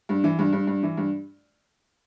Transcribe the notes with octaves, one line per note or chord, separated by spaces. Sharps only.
G2
E3
G2
G2
G2
E3
G2